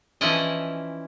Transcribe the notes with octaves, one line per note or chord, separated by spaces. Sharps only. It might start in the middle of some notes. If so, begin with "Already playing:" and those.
E3 F3 C#4 E4 D5 D#5